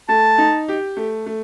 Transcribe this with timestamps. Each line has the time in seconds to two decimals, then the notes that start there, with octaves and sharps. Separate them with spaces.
0.09 A3 A5
0.38 D#4
0.68 G4
0.97 A3
1.26 A3